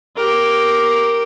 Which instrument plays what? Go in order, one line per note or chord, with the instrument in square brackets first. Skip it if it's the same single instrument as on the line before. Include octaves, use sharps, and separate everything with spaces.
[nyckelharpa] G4 A#4